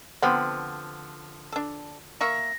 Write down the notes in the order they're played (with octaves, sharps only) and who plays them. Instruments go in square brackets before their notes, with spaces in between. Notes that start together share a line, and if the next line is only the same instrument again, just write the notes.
[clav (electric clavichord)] D3 F3 [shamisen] B3 C4 [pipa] B5
[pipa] D4 A4
[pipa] A#3 E5 C#6 [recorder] A#6